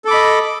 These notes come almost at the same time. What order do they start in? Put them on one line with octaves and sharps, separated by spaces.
A4 D6 B5 D#5